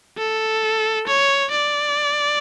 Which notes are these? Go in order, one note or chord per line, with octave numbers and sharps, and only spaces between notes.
A4
C#5
D5